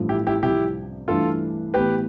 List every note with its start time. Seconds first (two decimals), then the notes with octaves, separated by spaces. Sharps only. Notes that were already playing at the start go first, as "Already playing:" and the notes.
Already playing: A1 G2 F3 A3
0.09 E4 G4
0.27 E4 G4
0.42 C2 C3 F3 E4 G4
1.08 G2 E3 A3 D4 F4 A4
1.74 A2 E3 B3 G4 B4